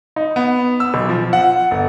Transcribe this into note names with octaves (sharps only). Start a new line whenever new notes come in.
D#4
B3
E6
B1
F3
F#5
G1